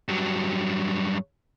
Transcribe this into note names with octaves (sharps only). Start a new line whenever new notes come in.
G2 F#3